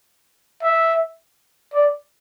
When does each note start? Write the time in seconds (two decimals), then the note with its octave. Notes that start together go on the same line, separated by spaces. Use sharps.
0.63 E5
1.74 D5